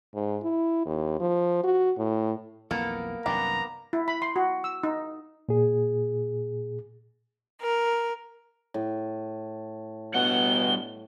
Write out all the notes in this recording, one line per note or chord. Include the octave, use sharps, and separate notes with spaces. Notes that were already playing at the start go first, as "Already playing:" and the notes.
G#2
E4
D#2
F3
F#4
A2
B1 F2 E3 A#3 B3 A4
C2 F#2 D#3 B3 D4 G4 A#5
E4
B5
C6
F#4
E6
D#4
A#2 G#4
A#4
A2
G2 B2 F#5 G7